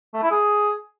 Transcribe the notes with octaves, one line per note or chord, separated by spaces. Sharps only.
A3
E4
G#4